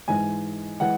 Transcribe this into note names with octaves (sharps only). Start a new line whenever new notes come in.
G#2 E3 G#3 G#5
E3 G#3 F#5